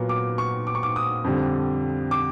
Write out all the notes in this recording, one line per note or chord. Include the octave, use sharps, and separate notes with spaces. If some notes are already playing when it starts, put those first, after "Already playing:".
Already playing: A#2 F#3 B3
D6
C#6
D6
C#6
D6
D#6
F2 D3 G3
D6